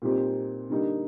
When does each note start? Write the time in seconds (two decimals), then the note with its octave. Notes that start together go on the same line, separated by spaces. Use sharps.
0.02 A#2 G3 C4 D#4 G4
0.70 D3 G3 A#3 D#4